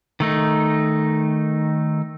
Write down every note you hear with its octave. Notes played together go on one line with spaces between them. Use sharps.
D#3 A3 D#4